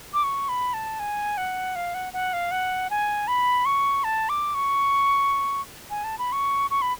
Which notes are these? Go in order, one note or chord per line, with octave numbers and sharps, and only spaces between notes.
D6
C#6
B5
A5
G#5
F#5
F5
F#5
F#5
F5
F#5
G#5
B5
C#6
A5
D6
C#6
G#5
A5
B5
C#6
C#6
B5